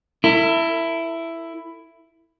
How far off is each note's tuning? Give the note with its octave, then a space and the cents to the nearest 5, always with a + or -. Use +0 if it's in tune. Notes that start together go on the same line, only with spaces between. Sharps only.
E4 +10 A#4 -45